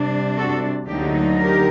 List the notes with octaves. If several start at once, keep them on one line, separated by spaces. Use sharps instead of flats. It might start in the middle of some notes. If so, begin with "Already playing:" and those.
Already playing: C3 G3 D4
F#4 A4
D2 D3 F#3 A#3 D#4 G4
G4 A#4